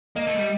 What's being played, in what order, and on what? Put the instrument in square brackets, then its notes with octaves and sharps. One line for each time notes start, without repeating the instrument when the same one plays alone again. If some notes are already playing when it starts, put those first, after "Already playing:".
[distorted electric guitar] A#3 [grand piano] D#5
[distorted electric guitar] A3
G3